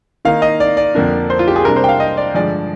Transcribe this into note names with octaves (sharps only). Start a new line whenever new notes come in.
D#3 A#3 D#4 F5
D#5
D5
D5
F2 D3 F3 A#3 D4
C5
F4
G4
G#4
C3 G3 A#3 D4 A#4
C5
G5
F5
D#5
D5
G2 D3 F3 G#3 D5